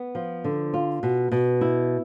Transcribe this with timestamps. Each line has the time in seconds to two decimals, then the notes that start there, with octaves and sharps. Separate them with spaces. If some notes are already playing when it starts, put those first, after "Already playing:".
Already playing: B3
0.15 F3
0.44 D3
0.74 F4
1.03 B2
1.32 B2
1.61 E4